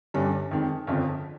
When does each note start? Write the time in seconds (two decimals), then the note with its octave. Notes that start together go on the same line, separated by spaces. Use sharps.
0.14 G1 G2 G3 C#4
0.51 F2 D#3 G#3
0.87 G1 F2 C#3 F3